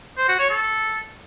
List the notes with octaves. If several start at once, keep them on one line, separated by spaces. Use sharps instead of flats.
C5
F#4
C#5
A4